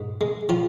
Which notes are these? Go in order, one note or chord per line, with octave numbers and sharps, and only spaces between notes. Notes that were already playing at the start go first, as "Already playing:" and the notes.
Already playing: G#2
G#3
F3 F4